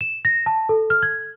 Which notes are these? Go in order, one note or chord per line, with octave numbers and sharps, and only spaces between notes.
E7
A#6
A5
A4
F6
G#6